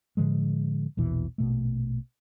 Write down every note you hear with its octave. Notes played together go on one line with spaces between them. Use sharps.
A2 D3 F3 G#3
A#1 E2 B2 E3
A#1 B2 A3